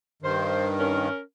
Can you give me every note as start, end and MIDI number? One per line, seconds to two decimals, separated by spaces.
0.22 1.08 43
0.22 1.08 51
0.22 0.66 72
0.79 1.18 61
0.79 1.18 70